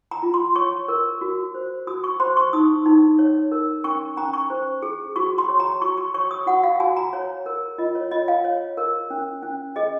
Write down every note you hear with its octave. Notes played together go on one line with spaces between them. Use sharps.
A#5
F4
C6
C#5 C#6
A#4
F#4
C5
F#4 D#6
C#6
C5 C6
C#6
D#4 D#6
D#4
C#5
A#4
C#4 C#6
C#4 A#5
C#6
C5
G#4
F#4 C#6
C6
C#5
A#5
F#4 C#6
C#6
C#5 C#6
D#6
F#4 F#5
F5
F#4 G#5
A#5
C#5
A#4
F4 D#5
C#5
F4 D#5
F5
C#5
A#4
C#4
C#4
G#4 D#5